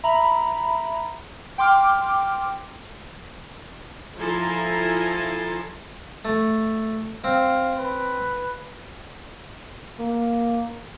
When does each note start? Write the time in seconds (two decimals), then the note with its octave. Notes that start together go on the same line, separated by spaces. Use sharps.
0.04 E5 A#5 B5
1.58 G5 C6 D6 F6
4.17 F3 E4 A4 G#5 A#5 C6
6.25 A3
7.24 C4 F5
7.76 B4
10.00 A#3